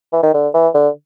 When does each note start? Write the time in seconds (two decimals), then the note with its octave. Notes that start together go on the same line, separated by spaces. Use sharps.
0.13 E3
0.23 D#3
0.34 D3
0.54 E3
0.74 D3